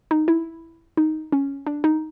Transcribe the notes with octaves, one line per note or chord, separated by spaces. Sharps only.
D#4
E4
D#4
C#4
D4
D#4